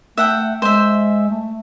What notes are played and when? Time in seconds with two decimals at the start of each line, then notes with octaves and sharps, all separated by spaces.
0.18 A3 E5 F#5 G5
0.62 G#3 C5 E5
1.31 A3